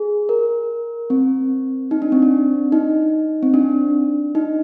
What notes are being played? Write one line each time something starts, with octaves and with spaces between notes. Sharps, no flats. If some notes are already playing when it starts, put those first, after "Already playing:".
Already playing: G#4
A#4
C4
D#4
D4
C4
D4
D#4
C4
D4
D#4